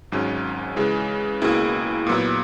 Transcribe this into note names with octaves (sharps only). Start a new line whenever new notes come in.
G#1 G#2 F#3 C#4
C#3 E3 G#3
C#2 B2 A#3 E4 G#4
A#2 F#3 B3 E4